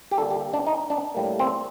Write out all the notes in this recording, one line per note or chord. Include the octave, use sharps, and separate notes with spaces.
G4
D3 G3 A#3 A4
G4
D4
D#4
D4
A2 G3 A#3
C4